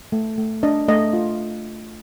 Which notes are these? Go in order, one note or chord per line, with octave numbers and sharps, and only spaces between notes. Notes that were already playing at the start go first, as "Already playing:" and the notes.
A3
A3
D4 D#5
A3 D#5
F4